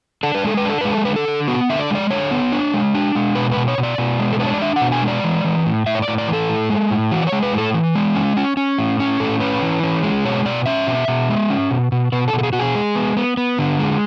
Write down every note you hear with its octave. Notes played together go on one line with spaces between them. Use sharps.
D4 A4
B4
G#3 A4
B4
D4 A4
G#3 B4
A4
D3 B4
A4
D3
B3 F#4
D3 E5
D5
G#3 D5
D3 C#5
B3
D4
G#3
D4
G#3
B2 B4
B4
B2
C#5
B2
D5
B2
G#3
A4
D4 B4
C#5
D5
D4 E5
F#5
B2
G#5
G#3
D5
E3
E3
A2
A2 E5
C#5
D5
A2
D5
E3
A4
A2
G#3
A2
E3 F#4
D5
C#5
G#3
B4
A2
A4
E3
G#3
C#4
C#4
C#4
A2
C#4
A2 A4
C#4 B4
E3
C#4
G#3
B2 C#5
B2 D5
C#4 E5
B2
B2
G#3
C#4
B2
B2
B2 B4
A4
B2
A4
G#4
B2 F#4
G#4
G#3
B3
B3
B3
D3
G#3